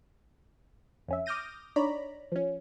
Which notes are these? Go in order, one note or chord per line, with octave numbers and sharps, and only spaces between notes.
F2 C#4 E5
D6 D#6 F6 G6 A#6 D#7
D4 D#4 C#5 D5 A#5 B5
F3 C#4